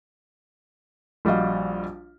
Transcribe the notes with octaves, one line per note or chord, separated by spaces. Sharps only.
A#1 G3 F#4 D#5 F5